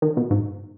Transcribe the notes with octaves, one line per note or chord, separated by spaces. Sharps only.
D#3
B2
G#2